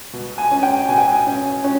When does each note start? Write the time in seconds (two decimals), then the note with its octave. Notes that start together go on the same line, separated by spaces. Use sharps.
0.13 B2
0.38 G#5
0.51 C#4
0.63 G5
0.89 B2 G#5
0.98 G5
1.07 G#5
1.26 C#4
1.64 C#4